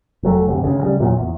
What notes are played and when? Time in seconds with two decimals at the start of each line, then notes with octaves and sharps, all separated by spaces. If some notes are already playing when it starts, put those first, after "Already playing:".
0.23 F1 F#3 A3
0.47 F#1 D2 C3
0.64 D2 C#3
0.81 C#3 F#3 G3
1.00 E2 A#2 F#3
1.20 E2